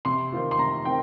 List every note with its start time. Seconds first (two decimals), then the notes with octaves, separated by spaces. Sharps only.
0.05 C3 C6
0.32 D#3 C4 F4
0.51 C6
0.59 C3 A#5
0.85 D#3 C4 G5